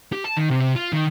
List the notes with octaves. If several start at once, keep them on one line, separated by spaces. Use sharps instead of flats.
G4
A5
D#3
C3
F4
D#3